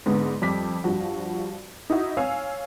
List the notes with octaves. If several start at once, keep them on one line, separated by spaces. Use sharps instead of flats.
G#2 D3 B3
F2 G3 D6 B6
G2 F3 F#4
D#4 E4 F#4
C#5 F5 G#5 E6